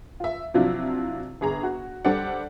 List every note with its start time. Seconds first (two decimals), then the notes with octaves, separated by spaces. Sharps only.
0.20 F4 E5
0.54 C3 F3 F#3 D4 E4 F4
1.41 G1 G#4 A#5
1.63 F#4
2.05 G3 D4 A4 C5 D5 F#5